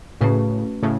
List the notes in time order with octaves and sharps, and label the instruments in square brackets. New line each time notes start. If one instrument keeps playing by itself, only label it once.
[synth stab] A2 C#3 [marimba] A3 C#4 F#4 B4
[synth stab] A2 C#3